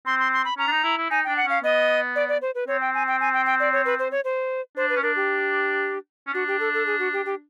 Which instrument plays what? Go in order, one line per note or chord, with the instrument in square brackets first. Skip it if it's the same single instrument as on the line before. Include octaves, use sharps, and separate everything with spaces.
[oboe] C4 [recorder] C6
[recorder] C6
C6
B5
[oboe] C#4 [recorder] A#5
[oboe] D4
D#4
E4
E4
[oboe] D#4 [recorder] G#5
[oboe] D4 [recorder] G5
[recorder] F#5
[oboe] C#4 [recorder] F5
[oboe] B3 [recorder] D#5
[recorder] D5
D5
C5
B4
[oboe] C4 [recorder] C#5
[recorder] G5
G#5
G5
G#5
G5
G5
D5
C#5
B4
C5
C#5
C5
[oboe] D4 [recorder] C5
[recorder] B4
[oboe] C#4
[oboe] D4 [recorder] A#4
[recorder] G4
[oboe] C#4
[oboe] D4 [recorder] F#4
[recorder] G4
A4
A4
G#4
F#4
G4
G4